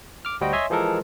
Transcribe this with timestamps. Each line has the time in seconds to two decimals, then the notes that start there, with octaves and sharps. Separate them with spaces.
0.25 D6 F6
0.41 D2 G3 F#4 C5 D#5 G5
0.53 C#5 D#5 E5 G#5 C6
0.70 E3 F3 G#3 A4 A#4